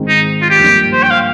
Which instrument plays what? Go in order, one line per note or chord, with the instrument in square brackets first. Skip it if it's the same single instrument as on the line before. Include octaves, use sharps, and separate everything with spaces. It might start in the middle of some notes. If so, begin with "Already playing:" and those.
Already playing: [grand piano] G#2 D#3 G#3 C4
[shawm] D#4
F4
G4
[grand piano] G2 F3 A#3
[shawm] C5
G5
F5